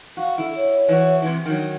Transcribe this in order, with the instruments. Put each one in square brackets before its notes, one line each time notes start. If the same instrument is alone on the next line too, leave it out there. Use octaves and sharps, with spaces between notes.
[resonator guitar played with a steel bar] F#4 [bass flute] F5
[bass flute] D3 [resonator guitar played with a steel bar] E4
[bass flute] C#5
[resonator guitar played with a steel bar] E3 F#4
C3 E3
[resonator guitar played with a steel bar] D#3 F#3 [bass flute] D4